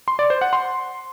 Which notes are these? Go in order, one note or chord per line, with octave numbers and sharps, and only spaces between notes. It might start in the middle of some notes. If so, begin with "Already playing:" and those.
C6
D5
C5
F#5
C6